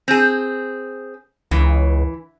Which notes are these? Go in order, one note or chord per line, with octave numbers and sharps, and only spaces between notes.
C4 G#4
C#2 E3